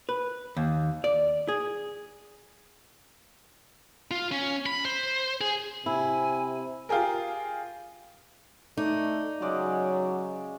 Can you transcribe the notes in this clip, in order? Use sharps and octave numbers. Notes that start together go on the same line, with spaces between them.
B4
D#2
D5
G#4
F4
C#4
B5
C5
G#4
C3 E4 G#5
F4 G4 G#4 A#4
A3 D#4 D5
C#3 F#3 G#3 D5